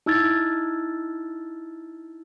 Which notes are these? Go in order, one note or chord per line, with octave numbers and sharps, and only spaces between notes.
D#4 E4 E6 F6 G#6 A6